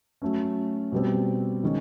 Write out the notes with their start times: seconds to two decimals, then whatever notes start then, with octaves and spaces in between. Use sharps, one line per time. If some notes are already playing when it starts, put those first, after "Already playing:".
0.22 F#3 A3 C#4
0.92 B2 G3 C4
1.63 D#3 G#3 C#4